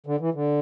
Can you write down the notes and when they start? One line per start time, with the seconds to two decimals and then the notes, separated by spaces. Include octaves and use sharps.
0.06 D3
0.20 E3
0.34 D3